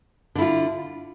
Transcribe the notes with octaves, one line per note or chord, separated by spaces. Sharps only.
D3 E4 F4